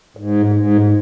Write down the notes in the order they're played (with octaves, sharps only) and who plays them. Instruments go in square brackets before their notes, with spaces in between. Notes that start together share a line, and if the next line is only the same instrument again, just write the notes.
[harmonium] G#2
G#2